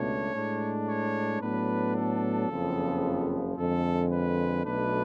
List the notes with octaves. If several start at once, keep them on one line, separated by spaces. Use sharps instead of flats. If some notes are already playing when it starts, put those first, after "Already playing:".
Already playing: C#2 B2 A3 D4 C#5
A2 G#3 D4
C#5
A2 F#3 B3 D4 B4
A4
F#1 F2 C#3 F3 B3
F2 D3 G#3 A4
B4
B1 B2 A3 D4 B4